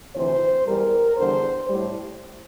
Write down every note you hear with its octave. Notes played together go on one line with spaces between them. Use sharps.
D2 C3 E3 C5
E2 E3 G3 A#4
E2 D3 G3 C5
A2 G3